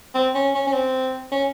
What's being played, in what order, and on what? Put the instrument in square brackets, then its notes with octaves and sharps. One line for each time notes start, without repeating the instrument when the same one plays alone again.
[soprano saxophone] C4
C#4
C#4
C#4
C4
C#4